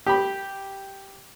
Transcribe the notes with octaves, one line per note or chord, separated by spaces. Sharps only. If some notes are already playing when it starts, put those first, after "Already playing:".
G4 B5